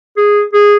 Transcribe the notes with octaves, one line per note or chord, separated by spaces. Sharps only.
G#4
G#4